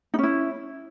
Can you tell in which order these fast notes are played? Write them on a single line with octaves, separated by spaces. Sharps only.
D#4 C#4 E4